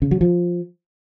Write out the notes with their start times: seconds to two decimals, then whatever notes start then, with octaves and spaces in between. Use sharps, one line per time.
0.02 C#3
0.11 F#3
0.21 F3